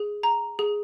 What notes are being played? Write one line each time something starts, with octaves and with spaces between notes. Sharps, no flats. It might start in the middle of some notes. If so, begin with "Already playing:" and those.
Already playing: G#4
A#5
G#4